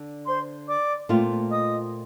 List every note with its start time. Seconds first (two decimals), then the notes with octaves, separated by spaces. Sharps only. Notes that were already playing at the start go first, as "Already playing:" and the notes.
Already playing: D3 D4
0.26 C5 C6
0.67 D5 D6
1.09 A#2 A3 C4 F4
1.51 D#5 D#6